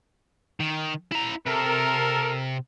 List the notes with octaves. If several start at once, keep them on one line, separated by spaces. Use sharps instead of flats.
D#3
E4 A#5
C3 A4 A#4